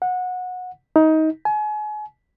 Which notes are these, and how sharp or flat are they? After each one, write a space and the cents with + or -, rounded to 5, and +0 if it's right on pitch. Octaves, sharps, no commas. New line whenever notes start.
F#5 -20
D#4 +20
G#5 +35